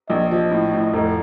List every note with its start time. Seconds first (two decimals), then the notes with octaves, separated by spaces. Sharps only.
0.10 A#1 D#5
0.31 F3
0.51 A2
0.74 A2
0.93 F1